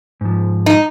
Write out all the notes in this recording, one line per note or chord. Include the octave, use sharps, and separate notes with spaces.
G#2 F3
D#4